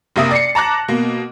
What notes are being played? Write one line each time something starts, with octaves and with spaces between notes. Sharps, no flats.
F#1 C3 A#3 E5 D#6
D5 C7 C#7
A5 A#5 D6 F#6 A#6
B2 A#3